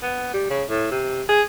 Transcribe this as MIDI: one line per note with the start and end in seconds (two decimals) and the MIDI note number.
0.02 0.28 59
0.34 0.46 55
0.50 0.64 49
0.69 0.89 45
0.91 1.23 48
1.29 1.42 68